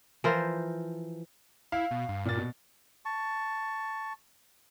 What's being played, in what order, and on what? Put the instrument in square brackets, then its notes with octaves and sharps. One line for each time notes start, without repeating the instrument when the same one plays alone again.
[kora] E3 F3 A#4 C5
[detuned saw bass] E4 [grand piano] F5
[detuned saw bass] B2
G2
[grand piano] A#2 A#3 A6
B2
[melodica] A5 C#6